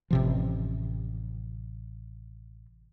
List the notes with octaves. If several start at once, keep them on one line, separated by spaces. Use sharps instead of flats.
A1 C3 F3